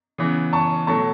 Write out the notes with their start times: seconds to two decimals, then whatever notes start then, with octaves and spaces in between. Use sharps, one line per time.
0.18 C#3 E3 B3
0.53 A5 C#6
0.87 B2 F#3 A3 A5 C#6